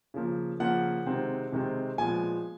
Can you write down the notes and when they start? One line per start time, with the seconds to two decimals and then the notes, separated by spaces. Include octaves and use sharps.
0.14 C#3 F3 A#3
0.60 C#3 F3 A#3 F#5
1.06 C3 D#3 G#3 C4
1.52 C3 D#3 G#3 C4
1.98 A#2 F3 G#3 B3 G#5